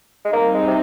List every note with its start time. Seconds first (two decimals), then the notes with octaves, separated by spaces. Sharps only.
0.25 G#3
0.33 G3 A#3 C4 D#4
0.54 G#3
0.67 C3